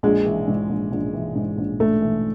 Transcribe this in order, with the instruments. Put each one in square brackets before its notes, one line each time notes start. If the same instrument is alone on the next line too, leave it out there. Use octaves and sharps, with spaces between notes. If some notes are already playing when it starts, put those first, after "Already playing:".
[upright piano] A#1 [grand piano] G#3
[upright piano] E3
G#2
A#1
A#1
E3
G#2
A#1
[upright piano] A#1 [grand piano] A3
[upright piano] E3